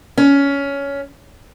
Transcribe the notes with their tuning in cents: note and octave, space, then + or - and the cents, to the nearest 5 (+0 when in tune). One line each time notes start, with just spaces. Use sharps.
C#4 +15